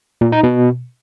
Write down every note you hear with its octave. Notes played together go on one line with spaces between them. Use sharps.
A#2
D#4
B2